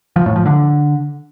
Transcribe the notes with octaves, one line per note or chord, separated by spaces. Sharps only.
F3
A2
F3
D3